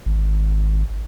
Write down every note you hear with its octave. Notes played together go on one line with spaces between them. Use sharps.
G#1